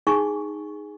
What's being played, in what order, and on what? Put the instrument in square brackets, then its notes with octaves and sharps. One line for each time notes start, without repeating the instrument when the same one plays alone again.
[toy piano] D#4 G#4 G#5 C#6